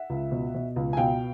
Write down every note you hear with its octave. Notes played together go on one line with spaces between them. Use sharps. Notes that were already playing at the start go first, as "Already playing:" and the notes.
Already playing: E5 F#5
C#2
B2
B2
C#2
G#5
B2 F5 G5